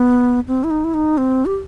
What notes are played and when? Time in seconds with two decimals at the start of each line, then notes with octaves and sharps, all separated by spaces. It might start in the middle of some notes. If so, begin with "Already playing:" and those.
Already playing: B3
0.48 C4
0.64 E4
0.71 D#4
0.84 E4
0.94 D#4
1.18 C4
1.46 G4